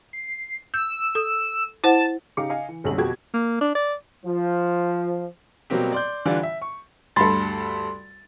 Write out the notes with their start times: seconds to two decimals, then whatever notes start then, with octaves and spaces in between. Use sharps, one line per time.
0.13 C7
0.74 E6 G6
1.15 A4 D#6
1.84 E4 C5 F#5 A5
2.37 C#3 D#4 G4 F5 D6 C#7
2.50 D#5 F5 G#5
2.69 E3
2.84 F#1 B1 D3 G3 C#4 F#7
2.98 F2 B2 F#4 G4 G#6
3.34 A#3
3.61 D4
3.75 D5
4.26 F3
5.70 B2 F#3 G3 A#3 C4 G4
5.92 D5 C6 G6
6.25 D3 E3 G3 D4 F4
6.43 E5
6.62 C#6
7.16 D2 G2 A4 B5 C6 A6